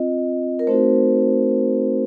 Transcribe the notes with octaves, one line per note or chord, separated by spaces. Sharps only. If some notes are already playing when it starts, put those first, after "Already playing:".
Already playing: C4 F4 D#5
A#4
A3 C4 D#4 F#4 C5